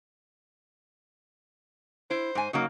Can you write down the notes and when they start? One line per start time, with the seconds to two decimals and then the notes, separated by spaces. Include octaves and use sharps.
2.10 E4 C5
2.35 G#2 G#5
2.53 C#3 F#3 A#3 D#4